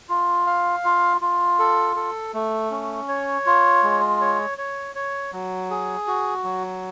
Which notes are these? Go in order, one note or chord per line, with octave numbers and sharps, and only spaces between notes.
F4
F5
F4
F4
A4
A4
A3
C#4
C#5
F4
G#3
C#5
C#5
C#5
F#3
G#4
F#4
F#3